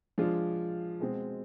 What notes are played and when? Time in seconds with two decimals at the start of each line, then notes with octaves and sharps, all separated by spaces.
0.18 F3 G#3 D4 F4
1.00 B2 G#3 C4